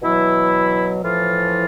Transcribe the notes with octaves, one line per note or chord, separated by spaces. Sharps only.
B2 E3 F#3 E4
A2 E3 F3 F4